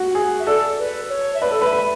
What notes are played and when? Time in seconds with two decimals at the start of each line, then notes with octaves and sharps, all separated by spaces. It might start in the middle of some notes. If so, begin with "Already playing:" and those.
Already playing: F#4
0.15 G#4
0.40 E5
0.47 A4 D5
0.79 B4
1.09 C#5
1.34 E5
1.42 B4 D5
1.51 A4
1.62 B4
1.64 E5
1.73 B4